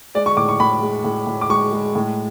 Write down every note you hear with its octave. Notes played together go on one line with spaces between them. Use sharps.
G#3 D5
C#6
A2 D6
C#6
A2 B5
G#3
A2
A2
D6
G#3 C#6
G#3
A2